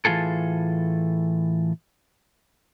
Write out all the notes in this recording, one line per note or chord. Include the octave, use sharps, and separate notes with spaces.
A2 E3 A#3 F4 G#4 A4